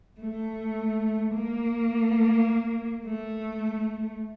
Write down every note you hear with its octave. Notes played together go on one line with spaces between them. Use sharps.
A3
A#3
A3